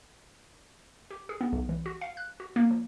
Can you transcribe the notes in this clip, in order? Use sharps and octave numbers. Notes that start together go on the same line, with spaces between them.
G4
G#4
B3
B1
E3
F#4
F5
F#6
F#4
A#3
F3